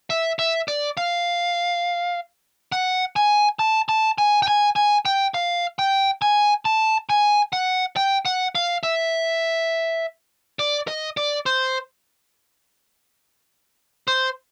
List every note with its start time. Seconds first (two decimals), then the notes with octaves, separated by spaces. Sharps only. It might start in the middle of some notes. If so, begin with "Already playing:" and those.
0.10 E5
0.39 E5
0.68 D5
0.97 F5
2.72 F#5
3.16 G#5
3.59 A5
3.89 A5
4.18 G#5
4.42 G5
4.48 G#5
4.76 G#5
5.05 G5
5.34 F5
5.79 G5
6.22 G#5
6.65 A5
7.10 G#5
7.53 F#5
7.96 G5
8.25 F#5
8.55 F5
8.83 E5
10.59 D5
10.88 D#5
11.17 D5
11.46 C5
14.08 C5